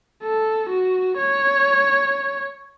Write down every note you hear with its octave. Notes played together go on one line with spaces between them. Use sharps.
A4
F#4
C#5